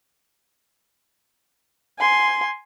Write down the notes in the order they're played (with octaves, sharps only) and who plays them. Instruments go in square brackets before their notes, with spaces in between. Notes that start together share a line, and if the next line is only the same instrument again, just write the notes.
[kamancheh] G#5 C6